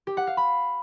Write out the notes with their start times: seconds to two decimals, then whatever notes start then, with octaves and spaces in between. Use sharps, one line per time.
0.07 G4
0.17 F#5
0.27 F5
0.37 B5